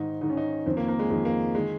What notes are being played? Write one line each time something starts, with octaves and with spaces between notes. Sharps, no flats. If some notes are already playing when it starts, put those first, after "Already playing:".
Already playing: G#2 D#3 D#4
G#2 D#3 D#4
C#4
D#4
F2 D#3 C4
A#3
A#3
G#3
F2 D#3 G#3
A#3
D#3 G#3